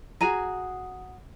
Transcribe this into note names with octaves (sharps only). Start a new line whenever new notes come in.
F#4 G#4 G#5 A#5